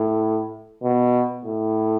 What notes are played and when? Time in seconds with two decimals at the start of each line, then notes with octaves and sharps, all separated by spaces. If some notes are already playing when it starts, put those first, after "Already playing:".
Already playing: A2
0.84 B2
1.45 A2